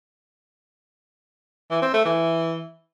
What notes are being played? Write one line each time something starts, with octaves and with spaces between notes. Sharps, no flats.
E3
C4
A3
E3